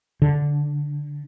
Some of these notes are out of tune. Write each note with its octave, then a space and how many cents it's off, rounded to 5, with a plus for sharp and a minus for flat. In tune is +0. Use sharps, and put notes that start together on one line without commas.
D3 -10